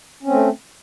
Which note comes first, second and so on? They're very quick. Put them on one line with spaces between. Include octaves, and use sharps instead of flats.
C#4 C4 A3